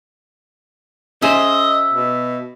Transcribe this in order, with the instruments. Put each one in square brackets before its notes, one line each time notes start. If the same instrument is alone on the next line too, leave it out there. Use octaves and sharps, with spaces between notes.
[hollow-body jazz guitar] C#4 G#4 C5 [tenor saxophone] D#5 [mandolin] E5
[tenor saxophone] B2